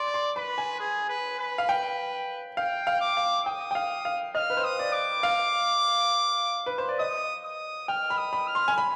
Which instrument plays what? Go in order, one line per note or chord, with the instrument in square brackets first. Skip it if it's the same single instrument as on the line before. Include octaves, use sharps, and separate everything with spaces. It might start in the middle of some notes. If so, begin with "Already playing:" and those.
Already playing: [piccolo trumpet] D5 [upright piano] C6
[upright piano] C6
[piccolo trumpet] B4 [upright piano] B5
[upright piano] G#5
[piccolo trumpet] G#4
B4
B4
[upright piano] F5
G5
[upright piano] F5 [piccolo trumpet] G5
[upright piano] F5
[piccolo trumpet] D6
[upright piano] F5
[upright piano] G5 [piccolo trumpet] D#6
[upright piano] G5
F5
F5
[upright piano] D#5 [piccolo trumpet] F6
[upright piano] B4
C5
[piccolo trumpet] D#6
[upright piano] D5
[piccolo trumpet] D6
[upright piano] F5
B4
C5
D5
[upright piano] D#5 [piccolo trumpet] D#6
[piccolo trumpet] D#6
[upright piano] G5 [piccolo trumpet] F6
[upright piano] B5
[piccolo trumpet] D#6
[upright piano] B5
[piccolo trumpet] F6
[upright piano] C6
G#5
B5